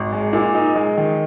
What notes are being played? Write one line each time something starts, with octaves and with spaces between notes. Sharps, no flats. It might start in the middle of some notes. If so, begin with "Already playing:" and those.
Already playing: G#1
G#3
A#2
D#4
G#3
D#3